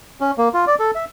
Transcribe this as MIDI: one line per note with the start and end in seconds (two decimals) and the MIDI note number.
0.21 0.31 61
0.38 0.49 58
0.54 0.65 65
0.67 0.75 74
0.79 0.91 69
0.95 1.05 76